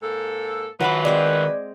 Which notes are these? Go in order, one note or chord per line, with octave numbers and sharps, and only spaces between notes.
G#2 A#3 A4
D#3 F#3 F4 F#4 B4 E5 B5 D6
G#3 C4 D5 G5